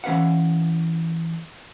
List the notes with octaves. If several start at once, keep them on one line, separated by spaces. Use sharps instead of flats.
E3 C#4 B4 F5 F#5